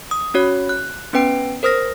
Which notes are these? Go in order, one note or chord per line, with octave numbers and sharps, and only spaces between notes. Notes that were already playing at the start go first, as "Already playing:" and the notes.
D#6
C#4 F#4 C#5
F#6
B3 C#4 B4 G5 D7
A#4 C5 D#6 F6 A#6